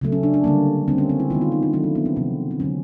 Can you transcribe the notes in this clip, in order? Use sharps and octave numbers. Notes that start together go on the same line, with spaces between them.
C#3 F#3 A3
C#4
D4
D4
D3 G3 A#3
D3 G3 A#3 C4
C#4
C4
E4
D#3 G#3 B3 F4
F4
D#4
D4
D#3 F#3 A3 C#4
C4
B3
C4
C3 F3 G#3 C4
C4
D3 F#3 A3 C#4